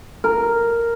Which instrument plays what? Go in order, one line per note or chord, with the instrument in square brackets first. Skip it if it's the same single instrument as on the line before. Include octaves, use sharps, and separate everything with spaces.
[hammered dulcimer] A#4